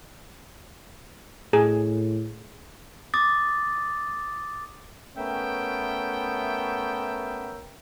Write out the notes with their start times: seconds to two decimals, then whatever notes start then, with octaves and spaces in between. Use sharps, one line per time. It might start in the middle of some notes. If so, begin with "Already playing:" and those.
1.53 A2 G#4
3.14 D6 D#6 A6
5.17 A3 B3 C#4 A#4 E5 G5